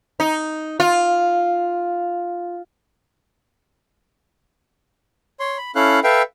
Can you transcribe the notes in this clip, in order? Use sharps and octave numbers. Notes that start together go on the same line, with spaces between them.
D#4
F4
C#5 C6
B5
C#4 E4 A4 F5 F#6
A4 B4 E5 F5 G5